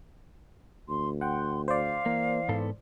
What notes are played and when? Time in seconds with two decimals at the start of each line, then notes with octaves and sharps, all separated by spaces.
0.89 D2 C6
1.21 F#5 G5 C6
1.68 C5 D5 F5
2.06 E3 A#3
2.49 G#2 B3 A4